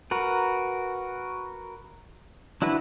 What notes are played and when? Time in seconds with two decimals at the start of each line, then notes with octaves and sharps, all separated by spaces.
0.11 F#4 A#4 B4
2.62 D4 E4 F#4 B4